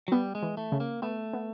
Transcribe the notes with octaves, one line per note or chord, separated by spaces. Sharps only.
F#3
G3 B3
G#3
E3
A3
C#3
A#3
A3 B3
B3